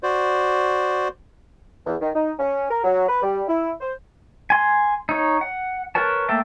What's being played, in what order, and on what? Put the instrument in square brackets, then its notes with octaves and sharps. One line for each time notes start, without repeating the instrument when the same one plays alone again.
[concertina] F#4 C5 D5
[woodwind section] E2
D#3
D#4
C#4
A#4
F#3
B4
G3
E4
C5
[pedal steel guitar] G#5 C6
D#4 C#5
F#5
A#4 B4 C#5 A5
A3 A#3 E5 G5 A5